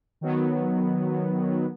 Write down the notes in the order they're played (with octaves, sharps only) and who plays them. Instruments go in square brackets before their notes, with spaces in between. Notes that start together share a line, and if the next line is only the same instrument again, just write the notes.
[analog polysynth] D#3 F#3 B3